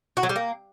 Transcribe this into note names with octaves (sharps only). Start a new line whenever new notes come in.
F#4
F#3
G3
A#3